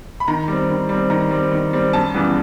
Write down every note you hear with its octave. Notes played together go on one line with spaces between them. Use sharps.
B5
D#3 A#5
G3 C4
D#3
G3 C4
D#3 A#5
G3 C4
D#3
G3 C4
F#2 A5
C#3 E3 G3 B3